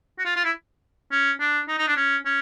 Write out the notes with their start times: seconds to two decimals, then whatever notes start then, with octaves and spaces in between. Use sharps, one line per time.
0.19 F#4
0.25 F4
0.36 F4
0.44 E4
1.11 C#4
1.40 D4
1.68 D#4
1.78 D#4
1.87 D4
1.97 C#4
2.25 C#4